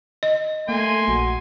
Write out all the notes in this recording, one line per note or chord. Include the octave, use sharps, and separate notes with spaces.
D#5
A3 A#3 G#5 C6
A#1 F#4